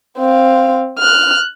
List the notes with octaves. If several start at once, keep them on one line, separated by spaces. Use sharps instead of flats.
C4 F5
F6 F#6